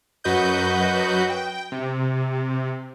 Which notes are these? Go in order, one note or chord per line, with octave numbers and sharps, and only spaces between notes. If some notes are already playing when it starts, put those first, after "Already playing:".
F#2 F#4 B4 D#5 G6
G5
C3